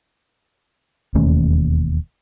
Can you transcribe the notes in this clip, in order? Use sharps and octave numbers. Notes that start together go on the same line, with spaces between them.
E1 D#2 A3 C#4